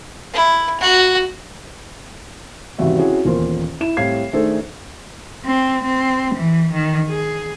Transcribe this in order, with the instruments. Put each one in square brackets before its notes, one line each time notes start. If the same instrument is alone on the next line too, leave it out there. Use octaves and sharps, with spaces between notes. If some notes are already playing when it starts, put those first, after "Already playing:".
[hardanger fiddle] E4
F#4
[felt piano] G#1 E2 C3 G3 F#4 E5
C4 C#4 E4 F#4 G#4
D#1 E2 A#3 F4 A#4 C5
E4 E7
A2 G3 C4 F5 G#6 C7
D#3 A3 D4 G#4 A4 C5
[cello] C4
C4
E3
D#3
G#4